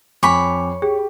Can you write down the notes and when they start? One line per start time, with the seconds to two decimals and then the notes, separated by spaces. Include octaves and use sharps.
0.23 F2 C#5 G#5 B5 D6
0.82 G4 G#4